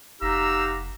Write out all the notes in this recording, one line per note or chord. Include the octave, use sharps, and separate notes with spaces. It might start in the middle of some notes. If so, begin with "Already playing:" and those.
F1 D#4 G4 F5 F#5 A#5 E6